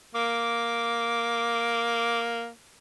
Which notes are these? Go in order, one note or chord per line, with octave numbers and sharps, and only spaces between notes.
A#3 D6